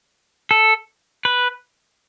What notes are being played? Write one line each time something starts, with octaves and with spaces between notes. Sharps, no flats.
A4
B4